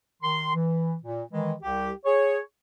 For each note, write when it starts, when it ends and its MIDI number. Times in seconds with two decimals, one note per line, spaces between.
0.22 0.51 51
0.22 0.51 84
0.54 0.94 52
1.03 1.23 46
1.31 1.53 51
1.31 1.53 52
1.31 1.53 56
1.62 1.91 36
1.62 1.91 67
2.05 2.39 68
2.05 2.39 73